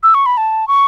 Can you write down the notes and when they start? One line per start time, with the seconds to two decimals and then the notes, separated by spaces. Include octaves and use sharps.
0.03 E6
0.14 C#6
0.26 B5
0.37 A5
0.68 C#6